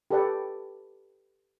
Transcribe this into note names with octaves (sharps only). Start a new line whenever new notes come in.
G4 A4 B4 D5 F#5 A5